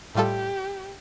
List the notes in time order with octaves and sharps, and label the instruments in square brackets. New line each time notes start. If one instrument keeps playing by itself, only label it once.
[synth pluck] A2 G3 F4 A4 [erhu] G4